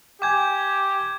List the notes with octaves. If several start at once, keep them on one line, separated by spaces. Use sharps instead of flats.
G4 G5 G#5 D6 G#6